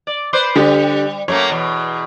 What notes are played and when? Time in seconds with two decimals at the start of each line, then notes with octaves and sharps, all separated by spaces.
0.07 D5
0.33 B4 C5 D5
0.56 D3 G3 G4
1.28 F#2 A3 A#3 C#5
1.50 E2 B2